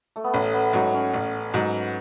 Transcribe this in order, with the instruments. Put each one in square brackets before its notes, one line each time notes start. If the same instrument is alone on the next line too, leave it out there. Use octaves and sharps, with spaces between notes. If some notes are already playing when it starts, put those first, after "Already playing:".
[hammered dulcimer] A3
B3
[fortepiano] A1 [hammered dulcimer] C#4
[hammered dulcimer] B3
[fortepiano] G#2 F#3 [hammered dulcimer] C#4
[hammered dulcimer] C#4
[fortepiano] A1
G#2 F#3